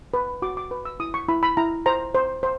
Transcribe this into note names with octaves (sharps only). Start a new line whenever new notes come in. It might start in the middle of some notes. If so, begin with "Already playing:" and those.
B4
F#4 D6
D6
B4
E6
E4 D#6
C#6
E4 B5
B5
E4 A#5
C5 A#5
C5
C5